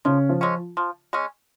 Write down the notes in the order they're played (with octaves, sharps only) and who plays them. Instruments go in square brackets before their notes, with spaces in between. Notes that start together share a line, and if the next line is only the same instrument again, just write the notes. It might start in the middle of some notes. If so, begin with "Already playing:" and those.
[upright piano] C#3 C#4 [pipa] F3
[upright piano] F3 F4
[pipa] G#3 C#4
F3
G#3 C#4